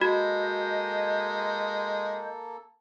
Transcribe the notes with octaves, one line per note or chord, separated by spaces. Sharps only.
G#3 A#3 F#4 A4 D#5 G6